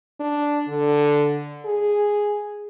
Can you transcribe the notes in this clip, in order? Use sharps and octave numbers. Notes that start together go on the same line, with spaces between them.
D4
D3
G#4